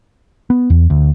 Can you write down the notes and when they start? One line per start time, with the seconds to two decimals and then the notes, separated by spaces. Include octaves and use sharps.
0.50 B3
0.70 E2
0.90 D2